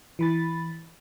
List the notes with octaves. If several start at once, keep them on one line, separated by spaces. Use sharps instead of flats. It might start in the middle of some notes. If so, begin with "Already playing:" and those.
E3 B5 A6